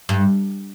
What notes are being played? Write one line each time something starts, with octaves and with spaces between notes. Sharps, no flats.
G2